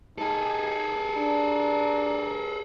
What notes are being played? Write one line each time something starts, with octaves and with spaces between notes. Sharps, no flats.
D#4 G#4 A4
D4 A#5